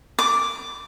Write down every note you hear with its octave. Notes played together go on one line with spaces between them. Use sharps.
D6